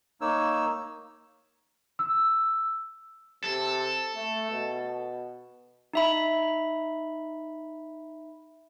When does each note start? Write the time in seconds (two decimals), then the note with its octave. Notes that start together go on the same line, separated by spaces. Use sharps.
0.21 A#3 D#4 C#5 E6
1.99 E6
3.44 C3 A4
4.15 A3
4.51 B2
5.93 D#4 E5 B5